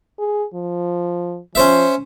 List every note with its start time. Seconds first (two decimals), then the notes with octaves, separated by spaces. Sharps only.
0.19 G#4
0.54 F3
1.55 F3 C#4 C5 E5